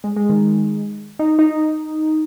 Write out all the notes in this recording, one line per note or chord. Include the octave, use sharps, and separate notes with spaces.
G#3
G#3
D#3
D#4
D#4